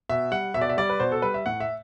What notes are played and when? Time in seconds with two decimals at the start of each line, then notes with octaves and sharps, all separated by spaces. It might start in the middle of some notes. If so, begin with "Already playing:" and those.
0.09 B2 E5
0.32 G3 F#5
0.54 B2 E5
0.61 D5
0.70 E5
0.77 G3 D5
0.90 B4
1.00 B2 C5
1.12 A4
1.22 G3 B4
1.34 E5
1.46 A2 F#5
1.60 E5